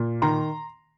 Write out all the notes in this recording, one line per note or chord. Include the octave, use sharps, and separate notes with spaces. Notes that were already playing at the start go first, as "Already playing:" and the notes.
Already playing: A#2
D#3 A#5 C6